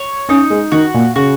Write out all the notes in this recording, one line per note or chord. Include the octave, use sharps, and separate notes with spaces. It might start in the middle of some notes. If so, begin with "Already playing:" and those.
Already playing: C#5
C#4 D#4
G#3
D#3 F#4
A#2
C#3 F#4